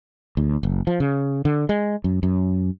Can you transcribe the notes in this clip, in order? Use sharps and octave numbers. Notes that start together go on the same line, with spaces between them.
D2
F#1
F3
C#3
D3
G#3
F#2
F#2